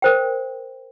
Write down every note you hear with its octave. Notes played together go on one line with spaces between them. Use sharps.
A#4 C5 G5